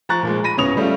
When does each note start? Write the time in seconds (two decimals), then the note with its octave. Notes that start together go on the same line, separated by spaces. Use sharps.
0.09 F3 A#5 C#6 F#6 A6
0.23 A#2 F3 G#3
0.44 B5 A#6 D#7
0.57 D1 B3 C#4 C#5 D#6 F7
0.77 G3 A3 C#4 F4